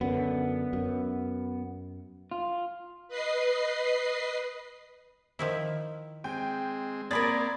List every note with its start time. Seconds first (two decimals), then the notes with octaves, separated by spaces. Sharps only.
0.01 F#2 D3 B3
0.73 F#2
2.31 F4
3.08 B4 D#5 C7
5.39 D#3 F3 E4
6.24 G#3 C4 G5
7.11 A#3 C4 A#4 D5 B5 D#6 G#6 A6